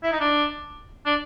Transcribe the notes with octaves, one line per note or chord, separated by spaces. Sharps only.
E4
D#4
D4
D4